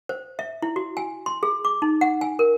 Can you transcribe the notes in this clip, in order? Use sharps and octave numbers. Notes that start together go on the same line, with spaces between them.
C5
E5
E4
F#4
G#5
C6
G#4
D6
D#4
F#5
G#5
A#4